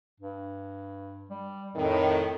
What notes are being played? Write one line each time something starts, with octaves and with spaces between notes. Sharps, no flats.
G2
G3
F2 A2 D#3